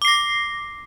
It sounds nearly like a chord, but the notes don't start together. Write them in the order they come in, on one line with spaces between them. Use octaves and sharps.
D6 C7 A#6